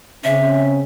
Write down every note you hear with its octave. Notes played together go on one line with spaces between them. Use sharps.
C#3 C4 C#4 E5